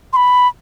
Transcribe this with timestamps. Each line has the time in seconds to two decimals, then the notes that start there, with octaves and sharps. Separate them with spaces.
0.13 C6
0.16 B5